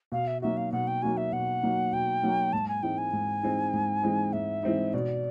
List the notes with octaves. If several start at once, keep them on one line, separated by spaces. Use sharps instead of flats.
B2 F5
E5
F#3 A#3 D#4 F#4 E5
F5
B2 F#5
G5
F#3 A#3 D#4 F#4 G#5
E5
B2 F#5
F#3 A#3 D#4 F#4
B2 G5
F#3 A#3 D#4 F#4
G#2 A5
G#5
E3 G#3 C4 D#4 G5
G#5
G#2
E3 G#3 C4 D#4
G#2
E3 G#3 C4 D#4
G#2 E5
E3 G#3 C4 D#4
B2 D5